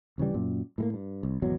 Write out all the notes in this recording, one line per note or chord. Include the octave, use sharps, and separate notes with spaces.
D#1 C#3 E3 G3
F#2 A#2
A2 G#3 A#3
G2
C2
G#1 E2 B2 F#3